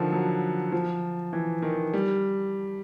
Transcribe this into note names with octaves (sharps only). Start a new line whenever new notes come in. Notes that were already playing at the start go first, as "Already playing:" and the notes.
Already playing: D3 D#3 F3
F#3
F3
E3
D#3
G3